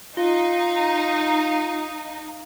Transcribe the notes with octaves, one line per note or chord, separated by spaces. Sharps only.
D#4 F4 F5